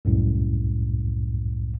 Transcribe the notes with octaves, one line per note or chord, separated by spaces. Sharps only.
C2 F#2 A2